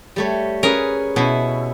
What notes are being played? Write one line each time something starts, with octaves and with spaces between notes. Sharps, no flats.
G3 A3 C#5
C#4 G#4 A#4 B4
B2 C#4 E4